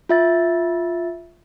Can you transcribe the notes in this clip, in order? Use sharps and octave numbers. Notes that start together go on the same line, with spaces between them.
F4 E5 A6